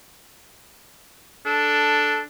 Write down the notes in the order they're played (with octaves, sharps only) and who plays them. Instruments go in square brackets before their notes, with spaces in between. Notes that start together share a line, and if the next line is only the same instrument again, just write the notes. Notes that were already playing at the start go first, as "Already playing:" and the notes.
[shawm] D4 [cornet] A4